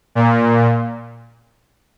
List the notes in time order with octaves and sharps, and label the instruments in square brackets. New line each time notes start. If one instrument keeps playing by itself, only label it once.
[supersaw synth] A#2